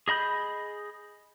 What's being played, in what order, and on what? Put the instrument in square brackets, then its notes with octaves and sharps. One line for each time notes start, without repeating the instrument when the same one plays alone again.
[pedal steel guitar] G#4 D#5 B5 G6